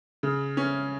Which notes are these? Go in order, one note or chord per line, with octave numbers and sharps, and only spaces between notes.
C#3
C#4